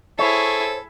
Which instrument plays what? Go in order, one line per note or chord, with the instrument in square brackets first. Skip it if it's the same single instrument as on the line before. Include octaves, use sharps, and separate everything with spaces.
[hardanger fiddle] E4 G#4 [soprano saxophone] A4 [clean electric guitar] C5 C#5